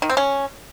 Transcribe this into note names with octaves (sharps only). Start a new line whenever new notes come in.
D#3
C4
C#4